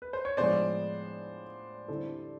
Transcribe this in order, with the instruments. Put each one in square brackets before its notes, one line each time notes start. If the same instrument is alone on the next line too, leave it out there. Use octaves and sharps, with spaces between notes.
[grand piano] B4
C5
C#5
[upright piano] A2 F3 G#3 B3 D4 [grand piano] C5 D5
[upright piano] D3 G3 C4 E4 A4